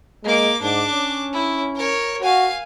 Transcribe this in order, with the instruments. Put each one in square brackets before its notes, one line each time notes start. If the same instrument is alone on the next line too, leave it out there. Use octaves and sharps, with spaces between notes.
[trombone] G#3 [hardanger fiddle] A#3 D6
[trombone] G#2 [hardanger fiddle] D4 D6
[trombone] C#4
[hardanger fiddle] E4
A#4 C#5
[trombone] F#4 [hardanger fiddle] F5 G#5